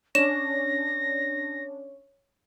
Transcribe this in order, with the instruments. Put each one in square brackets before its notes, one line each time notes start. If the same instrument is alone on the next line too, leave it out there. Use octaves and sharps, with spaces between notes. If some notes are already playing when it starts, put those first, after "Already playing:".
[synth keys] C#4 D4 [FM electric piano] C#5 [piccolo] A#6 [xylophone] E7